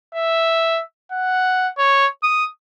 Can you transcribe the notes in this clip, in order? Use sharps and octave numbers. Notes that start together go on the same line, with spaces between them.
E5
F#5
C#5
D#6